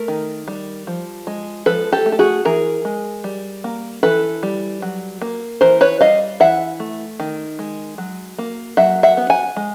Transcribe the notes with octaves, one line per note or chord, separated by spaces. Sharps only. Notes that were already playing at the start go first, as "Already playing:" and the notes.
Already playing: A3 A#4
D#3
G3
F3
G#3
F3 A4 B4
G4 A4
A3
A4
F#4 G#4
E3 G#4 A#4
G#3
G3
A#3
E3 A4 B4
G3
F#3
A#3
E3 A#4 C5
B4 C#5
G3 D#5 F5
E3 E5 F#5
A3
D#3
G#3
F#3
A#3
F#3 E5 F#5
E5 F#5
B3
F#5 G#5
G#3